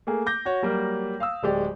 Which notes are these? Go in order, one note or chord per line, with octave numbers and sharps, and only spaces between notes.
A3 A#3 G#4
D6 G6 A#6
F#4 C#5
F#3 G3 A#3
F5 D#6 E6
D1 G#3 G4 D5